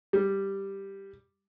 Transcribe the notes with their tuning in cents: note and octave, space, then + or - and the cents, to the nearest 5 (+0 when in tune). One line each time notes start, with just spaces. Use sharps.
G3 +0